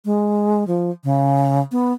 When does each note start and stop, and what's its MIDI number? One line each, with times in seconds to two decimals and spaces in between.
0.05 0.66 56
0.67 0.91 53
1.04 1.60 49
1.71 1.93 59